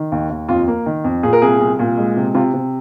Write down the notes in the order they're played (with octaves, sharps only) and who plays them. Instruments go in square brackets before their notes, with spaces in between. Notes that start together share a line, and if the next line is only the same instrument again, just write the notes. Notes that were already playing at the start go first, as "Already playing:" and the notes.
Already playing: [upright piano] D#3
D#2
D#2
F2 F4
A#3
D#3
F2
A#2 G#4
A#4
C2 G#4
C2
A#2
G#3
C3
C3 F4
C3